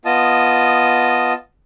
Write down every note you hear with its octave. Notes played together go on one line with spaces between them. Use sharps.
B3 F4 D#5 A5 D#6